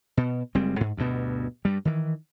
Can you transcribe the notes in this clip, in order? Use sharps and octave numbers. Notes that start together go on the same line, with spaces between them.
B2
F#1 G3 G#3 C4
G#2
D2 G2 B2
G2 G3
D#3 E3